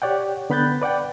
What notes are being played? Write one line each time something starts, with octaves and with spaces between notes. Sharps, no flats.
G4 C#5 D5 F#5 G5
D3 B3 B5 F#6 G6 A6
B4 D5 F#5 G5